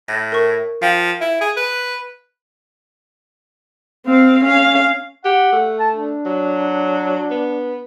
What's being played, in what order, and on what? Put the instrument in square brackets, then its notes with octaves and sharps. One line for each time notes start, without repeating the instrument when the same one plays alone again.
[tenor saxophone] A2 [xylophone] A#6
[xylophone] A#4 C#6
[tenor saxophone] F3 [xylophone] F5 G5
[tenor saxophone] E4
G#4
B4
[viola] C4 F5
C#4 F5
[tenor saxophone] G4 [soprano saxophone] F#5
[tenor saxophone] A3
[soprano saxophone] A5
D4
[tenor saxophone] F#3
B3